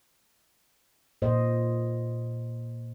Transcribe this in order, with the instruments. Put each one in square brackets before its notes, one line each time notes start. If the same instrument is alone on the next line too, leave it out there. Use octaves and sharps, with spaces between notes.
[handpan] A#2 C5 D#5